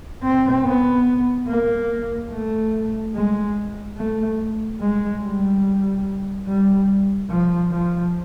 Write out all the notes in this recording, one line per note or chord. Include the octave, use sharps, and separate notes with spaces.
C4
B3
A#3
A3
G#3
A3
G#3
G3
G3
F3
F3